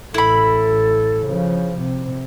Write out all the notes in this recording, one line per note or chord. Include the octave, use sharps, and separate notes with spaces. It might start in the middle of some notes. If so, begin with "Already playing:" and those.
A1 E4 A4 B5
C#3 F3
C3